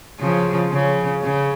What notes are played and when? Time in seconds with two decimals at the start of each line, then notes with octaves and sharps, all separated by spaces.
0.20 C#3 F3
0.72 C#3
1.24 C#3